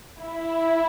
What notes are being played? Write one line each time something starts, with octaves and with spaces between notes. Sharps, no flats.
E4